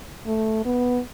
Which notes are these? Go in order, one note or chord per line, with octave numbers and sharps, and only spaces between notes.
A3
B3